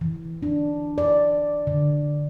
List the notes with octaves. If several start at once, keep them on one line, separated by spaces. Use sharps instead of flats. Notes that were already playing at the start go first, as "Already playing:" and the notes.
E3
D4
D5
D3